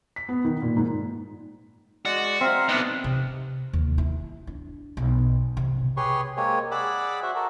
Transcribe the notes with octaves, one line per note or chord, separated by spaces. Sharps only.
B6
B3
D#3
A#2
G#2
G#3 F#4 D5
C4 A#4 E5 F5
B3 D4 D#4
C3
D#2
E4
D4
B1
C3
G4 G#4 B4 C#5 C6 C#6
G#3 A#3 C4 G4 C#5 G#5
G#4 D5 F#5 B5 D6 E6
F#4 C5 E5
F#4 A4 A#4